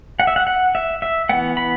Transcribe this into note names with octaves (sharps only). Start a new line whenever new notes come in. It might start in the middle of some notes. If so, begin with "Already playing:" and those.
F#5
E5
F#5
F#5
E5
E5
E3 B3 F#5
B5